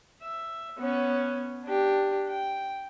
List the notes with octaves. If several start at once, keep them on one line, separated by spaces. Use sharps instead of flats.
E5
B3 C#4
D4 G4
G5